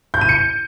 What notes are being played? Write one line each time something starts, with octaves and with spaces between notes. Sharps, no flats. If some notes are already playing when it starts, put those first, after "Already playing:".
G6
D#7
C#7